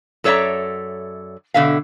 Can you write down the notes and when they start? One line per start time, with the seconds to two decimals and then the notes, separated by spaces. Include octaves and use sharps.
0.24 F#2 A4 C#5 D5 E5 A#5
1.54 B2 D3 E5 F5